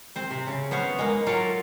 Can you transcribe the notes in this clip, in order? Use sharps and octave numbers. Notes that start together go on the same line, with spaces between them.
C4 C5
C3
C#3
B3 C5 C#5 F5
G#3 A#3
F#3 F4 A4 A#4 F5